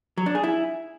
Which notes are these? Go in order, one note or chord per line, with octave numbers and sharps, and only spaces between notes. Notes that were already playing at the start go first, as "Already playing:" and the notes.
F#3
D4
G#4
E4